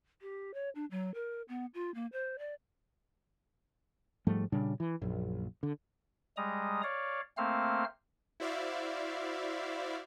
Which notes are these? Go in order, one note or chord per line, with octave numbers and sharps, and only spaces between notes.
G4
C#5
D4
F#3
A#4
B3
F4
A#3
C5
D5
G#2 F3 G3 A3
A#2 C#3 G3 D4
E3
A#1 F#2
D3
G3 G#3 A#5 D#6
C#5 D5 F5
A3 A#3 C4 C5 F5 F6
E4 F#4 C5 D5 E5 F5